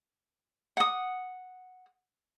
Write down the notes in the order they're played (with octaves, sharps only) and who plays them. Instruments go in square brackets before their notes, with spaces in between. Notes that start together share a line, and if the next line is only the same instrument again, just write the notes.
[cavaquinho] F#5 D#6